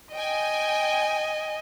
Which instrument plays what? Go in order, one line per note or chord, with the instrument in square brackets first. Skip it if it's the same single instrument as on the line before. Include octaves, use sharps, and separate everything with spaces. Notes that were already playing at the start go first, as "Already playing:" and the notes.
[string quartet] D#5 [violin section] G5 G#5